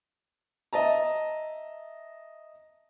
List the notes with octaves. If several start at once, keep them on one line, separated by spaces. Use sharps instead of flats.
D#5 E5 A5 A#5